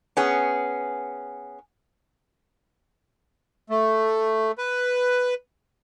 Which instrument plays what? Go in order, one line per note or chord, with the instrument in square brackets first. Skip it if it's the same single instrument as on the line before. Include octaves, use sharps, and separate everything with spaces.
[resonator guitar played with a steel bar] B3 C#4 G#4
[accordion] A3
B4